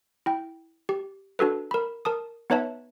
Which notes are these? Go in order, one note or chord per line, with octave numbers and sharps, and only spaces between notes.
E4 G5
G4
D4 F#4 A4 B4
A#4 B5
A#4 A5 D#6
B3 D#4 B4 C#5 E5 A5